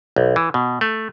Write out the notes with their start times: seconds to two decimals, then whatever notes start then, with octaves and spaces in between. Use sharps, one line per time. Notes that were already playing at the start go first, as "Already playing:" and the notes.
0.16 B1
0.36 E3
0.54 B2
0.81 A3